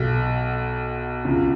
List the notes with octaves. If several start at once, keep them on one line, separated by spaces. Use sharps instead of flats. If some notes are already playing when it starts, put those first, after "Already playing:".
Already playing: B1 B2
C#2 C#3